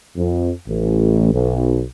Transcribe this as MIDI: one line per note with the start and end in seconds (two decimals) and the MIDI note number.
0.16 0.51 41
0.68 1.31 33
1.33 1.83 35